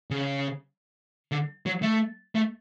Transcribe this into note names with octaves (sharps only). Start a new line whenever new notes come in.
C#3
D3
F#3
A3
A3